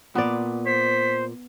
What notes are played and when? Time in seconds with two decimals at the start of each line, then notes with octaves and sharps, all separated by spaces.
0.15 A#2 B3 D5
0.66 C5 B6